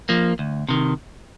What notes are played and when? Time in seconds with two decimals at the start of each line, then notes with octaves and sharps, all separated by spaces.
0.09 F3 A#3
0.39 D2
0.69 C3 D#3